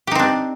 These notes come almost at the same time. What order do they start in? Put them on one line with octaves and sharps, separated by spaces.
G4 D#4 C4 D4